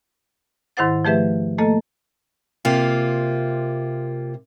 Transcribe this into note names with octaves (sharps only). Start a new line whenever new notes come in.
G#2 D#3 E4 C5 F#5 A6
F3 A3 G4 G#4 B4 E5
A3 A#3 A4 D#5 A5
C3 A#3 F4